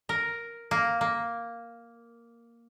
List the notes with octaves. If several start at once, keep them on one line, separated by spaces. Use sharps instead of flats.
A#4
A#3
A#3